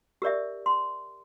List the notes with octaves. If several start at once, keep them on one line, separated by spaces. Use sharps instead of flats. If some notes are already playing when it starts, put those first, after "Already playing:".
G4 A#4 D5 E5
C6